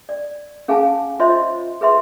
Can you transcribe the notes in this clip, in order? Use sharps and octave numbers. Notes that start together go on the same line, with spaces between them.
D5
C#4 G#4 F5 G#5 A5
F4 C5 C#5 D#5 E5 C6
G#4 B4 E5 C6